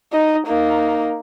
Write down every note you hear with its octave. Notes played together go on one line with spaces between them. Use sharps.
D#4 D#5
A#3 D#4